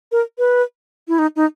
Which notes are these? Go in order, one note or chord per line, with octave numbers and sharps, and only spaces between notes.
A#4
B4
E4
D#4
D#4